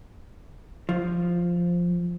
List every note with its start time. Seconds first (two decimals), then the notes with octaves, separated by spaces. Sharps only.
0.89 F3